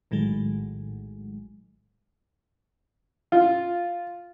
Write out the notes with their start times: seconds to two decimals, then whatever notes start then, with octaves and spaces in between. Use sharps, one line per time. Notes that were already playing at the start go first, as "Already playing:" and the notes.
0.11 A#1 A2 D#3 F#3 G#3
3.32 F4